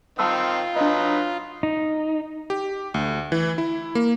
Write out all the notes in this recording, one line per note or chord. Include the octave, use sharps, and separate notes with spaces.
D#3 C4 F4 A5 B5 E6
F#3 D4 D#4 B4 D#5
D#4
G4
D2
E3
E4
A#3